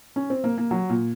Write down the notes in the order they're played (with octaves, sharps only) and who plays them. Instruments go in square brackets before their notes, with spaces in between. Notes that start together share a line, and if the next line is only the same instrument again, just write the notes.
[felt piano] C#4
C4
A#3
A#3
F#3
A#2